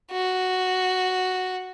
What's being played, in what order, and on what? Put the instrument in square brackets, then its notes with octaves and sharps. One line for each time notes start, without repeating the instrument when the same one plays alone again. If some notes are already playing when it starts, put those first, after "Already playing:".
[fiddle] F#4